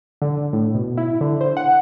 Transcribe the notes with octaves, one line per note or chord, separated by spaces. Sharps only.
D3
A2
B2
E4
D3
C5
F#5